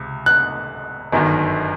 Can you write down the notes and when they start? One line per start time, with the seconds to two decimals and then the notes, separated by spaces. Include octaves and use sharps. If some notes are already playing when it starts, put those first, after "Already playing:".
Already playing: C#2 C3
0.26 F#6
1.12 G1 F#2 D#3